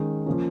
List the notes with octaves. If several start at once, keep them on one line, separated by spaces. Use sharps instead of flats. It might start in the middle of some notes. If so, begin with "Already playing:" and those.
Already playing: D#3 G#3 C#4
F3 A#3 C#4